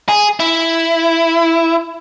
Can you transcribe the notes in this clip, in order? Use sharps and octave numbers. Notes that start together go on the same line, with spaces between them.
G#4
E4